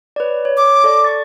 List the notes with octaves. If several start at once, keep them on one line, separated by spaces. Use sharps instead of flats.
B4 C#5 D5
C#5
D6
A4 D5
C#6 A6